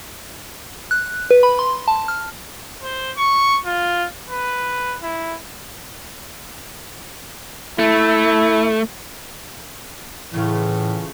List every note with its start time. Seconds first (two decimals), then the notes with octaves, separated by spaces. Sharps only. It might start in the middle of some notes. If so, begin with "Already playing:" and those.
0.91 F#6
1.31 B4
1.43 B5
1.59 C6
1.88 A5
2.08 F6
2.83 C5
3.17 C#6
3.66 F4
4.29 B4
5.03 E4
7.79 A3 E4
10.34 A2 C#3 E3 A3 F4